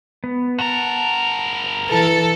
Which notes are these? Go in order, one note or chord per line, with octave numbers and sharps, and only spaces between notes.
B3
G2 A#4 F#5 A5
E3 A4